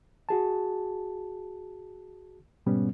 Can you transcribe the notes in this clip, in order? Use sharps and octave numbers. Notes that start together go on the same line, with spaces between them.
F#4 G#4 A5
G#2 B2 G3 B3 C#4